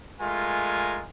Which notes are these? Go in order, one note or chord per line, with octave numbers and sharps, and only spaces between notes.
G#3 A3 F4 A#4 G#5